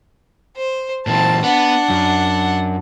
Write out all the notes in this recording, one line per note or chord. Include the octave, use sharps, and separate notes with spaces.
C5
A#2 E3 C4 A5
B3 D4 F#5
F#2